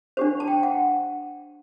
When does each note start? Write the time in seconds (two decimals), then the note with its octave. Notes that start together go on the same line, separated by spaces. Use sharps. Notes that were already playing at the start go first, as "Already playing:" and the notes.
0.17 D4 G4 C5
0.40 A5
0.48 G5
0.63 F#5